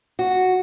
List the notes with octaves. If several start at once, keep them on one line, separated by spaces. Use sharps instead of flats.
F#4